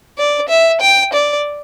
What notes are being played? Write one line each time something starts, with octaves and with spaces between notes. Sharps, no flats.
D5
E5
G5
D5